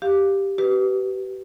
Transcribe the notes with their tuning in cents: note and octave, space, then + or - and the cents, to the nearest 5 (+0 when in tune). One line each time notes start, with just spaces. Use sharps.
G4 +0 F5 +0
G4 -35 B4 +0